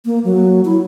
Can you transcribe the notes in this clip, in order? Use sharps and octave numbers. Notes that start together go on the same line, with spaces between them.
A#3
F#3
E4